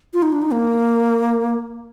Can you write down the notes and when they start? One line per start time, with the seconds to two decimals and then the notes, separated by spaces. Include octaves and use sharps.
0.14 F4
0.22 D#4
0.32 D4
0.42 D#4
0.51 A#3